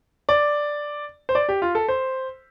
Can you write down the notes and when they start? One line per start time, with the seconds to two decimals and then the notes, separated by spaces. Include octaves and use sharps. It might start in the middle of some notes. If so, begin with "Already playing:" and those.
0.29 D5
1.29 C5
1.35 D5
1.49 G4
1.62 F4
1.75 A4
1.88 C5